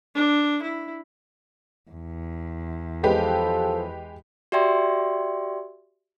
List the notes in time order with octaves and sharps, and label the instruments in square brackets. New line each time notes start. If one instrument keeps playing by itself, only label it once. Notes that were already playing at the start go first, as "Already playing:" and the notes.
[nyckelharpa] D4
E4
[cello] E2
[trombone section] F3 F4 A4 [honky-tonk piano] G#3 G4 B4
[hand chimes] F#4 G4 D5 E5 G5 C6